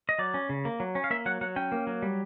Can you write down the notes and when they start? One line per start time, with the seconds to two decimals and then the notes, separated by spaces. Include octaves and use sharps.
0.09 D#5
0.19 F#3 D5
0.34 C#4
0.49 C#3
0.65 A#3
0.80 F#3
0.95 C#4
1.04 F5
1.10 A#3 E5
1.26 F#3 F#5
1.41 F#3 F#5
1.56 C#4 G5
1.72 A#3
1.87 F#3
2.02 G3